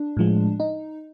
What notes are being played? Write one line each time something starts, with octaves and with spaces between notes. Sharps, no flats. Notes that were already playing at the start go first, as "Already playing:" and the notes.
Already playing: D4
A2 F3 G#3
D#4